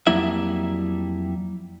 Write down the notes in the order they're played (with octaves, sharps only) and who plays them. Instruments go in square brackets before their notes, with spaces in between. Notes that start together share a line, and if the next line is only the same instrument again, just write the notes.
[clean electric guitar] F2 F#3 G3 A#3 E4 E5